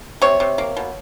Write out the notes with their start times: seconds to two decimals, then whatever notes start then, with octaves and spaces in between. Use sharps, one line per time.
0.22 C3 C#5
0.40 C3
0.58 A#3
0.77 B2